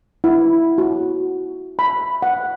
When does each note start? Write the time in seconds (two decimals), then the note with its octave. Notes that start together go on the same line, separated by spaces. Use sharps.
0.24 E4
0.78 F#4
1.79 B5
2.22 F#5